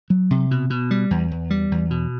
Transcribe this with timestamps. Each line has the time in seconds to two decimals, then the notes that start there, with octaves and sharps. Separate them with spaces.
0.10 F#3
0.31 C3
0.51 B2
0.70 B2
0.91 G3
1.11 E2
1.31 E2
1.50 G3
1.72 E2
1.91 B2